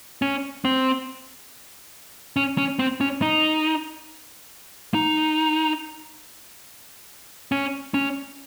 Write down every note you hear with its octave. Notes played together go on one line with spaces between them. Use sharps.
C#4
C4
C#4
C#4
C4
C#4
D#4
D#4
C#4
C#4